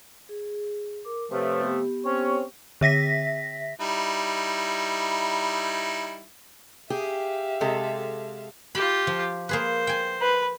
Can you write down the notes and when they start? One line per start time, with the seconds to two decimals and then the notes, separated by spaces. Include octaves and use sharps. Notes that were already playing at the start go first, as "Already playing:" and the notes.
0.29 G#4
1.05 A#4 D6
1.31 C3 F3 A3 B4 C#5
1.61 B3 G4
2.05 C4 C#4 C#5
2.81 D3 E5 A#6 B6
3.80 G3 D#4 E4
6.90 G4 G#4 E5 F5
7.61 C3 G#3 A4
8.75 F4 G4 B5
9.07 F3
9.49 A#3 G#4 B4 C5
9.87 G5 G#5
10.22 B4